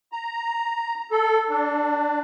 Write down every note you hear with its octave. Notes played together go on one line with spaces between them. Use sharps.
A#5
A4
D4